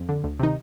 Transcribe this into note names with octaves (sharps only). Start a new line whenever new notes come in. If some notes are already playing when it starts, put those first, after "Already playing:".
Already playing: F2
D3
D2
C3 D#3 D#4